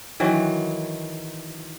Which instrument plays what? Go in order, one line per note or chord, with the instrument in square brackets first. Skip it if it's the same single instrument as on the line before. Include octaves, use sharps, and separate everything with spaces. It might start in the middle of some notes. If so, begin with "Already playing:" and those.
[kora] D#3 E3 F#3